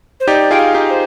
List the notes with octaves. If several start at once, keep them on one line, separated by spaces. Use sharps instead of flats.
C5
D#4 G4 D5
F4 G#4 G5
F5
D#4 G4
C5